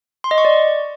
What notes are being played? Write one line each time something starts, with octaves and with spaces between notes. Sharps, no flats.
C6
D#5
C#6
D5